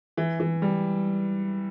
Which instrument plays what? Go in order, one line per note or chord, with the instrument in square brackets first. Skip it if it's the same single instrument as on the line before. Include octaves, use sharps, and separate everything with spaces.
[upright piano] E3
E3
G3